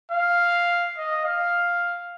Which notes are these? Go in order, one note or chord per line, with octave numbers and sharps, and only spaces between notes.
F5
D#5
F5